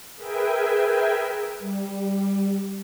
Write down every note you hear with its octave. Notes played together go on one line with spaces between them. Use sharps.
G#4 A#4 B4 E5 G5 G#5
G3